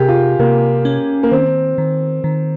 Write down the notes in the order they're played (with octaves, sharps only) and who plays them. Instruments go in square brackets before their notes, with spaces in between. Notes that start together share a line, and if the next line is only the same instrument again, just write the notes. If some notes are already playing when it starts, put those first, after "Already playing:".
Already playing: [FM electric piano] C3 [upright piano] G4 G#4 A#4
[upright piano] F4
[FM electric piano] C3 [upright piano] A#3
[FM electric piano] C#4
[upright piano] A#3
[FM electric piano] D#3 [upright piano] C4
[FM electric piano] D#3
D#3